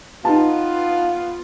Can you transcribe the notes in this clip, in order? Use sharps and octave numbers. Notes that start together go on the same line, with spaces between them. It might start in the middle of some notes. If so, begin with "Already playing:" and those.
B3 D#4 F4 A5